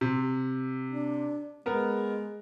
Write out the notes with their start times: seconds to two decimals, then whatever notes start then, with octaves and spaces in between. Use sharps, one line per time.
0.01 C3
0.90 D4
1.66 G#3 B3 A#4